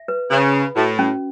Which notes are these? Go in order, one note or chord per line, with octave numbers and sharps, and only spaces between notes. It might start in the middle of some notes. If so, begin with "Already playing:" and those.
Already playing: E5
B4
C#3 B4
B5
A2 F#4
C#4